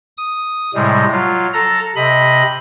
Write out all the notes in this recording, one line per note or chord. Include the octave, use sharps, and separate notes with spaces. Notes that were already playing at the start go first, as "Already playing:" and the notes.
D#6
A2 C3 G3 G#3
F#3 F4
A4 A#5
C3 D#5 B5